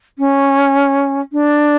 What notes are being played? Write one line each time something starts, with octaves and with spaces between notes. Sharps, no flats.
C#4
D4